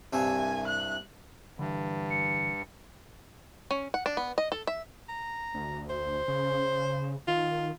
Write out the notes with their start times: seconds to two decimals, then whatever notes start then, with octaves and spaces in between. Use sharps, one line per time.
0.13 C2 G2 E5 G#5
0.67 F#6
1.59 G2 D3 E3
2.10 C#7
3.71 C#4
3.94 F#5
4.06 D4
4.17 B3
4.38 D#5
4.52 A4
4.67 E5
5.09 A#5
5.54 D2
5.90 C5
6.28 C#3
7.28 D#3 F4